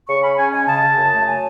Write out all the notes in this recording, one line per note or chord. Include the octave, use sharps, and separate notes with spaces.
C#3 C#6
C#4 B5
C#4 G#5
G#3 G#5
C#3 A5
C#3
F#2
A3
F#3 G#5